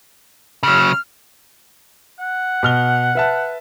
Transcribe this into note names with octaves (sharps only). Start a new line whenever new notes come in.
C#3 F#3 F6
F#5
B2 F6 G7
B4 E5 A5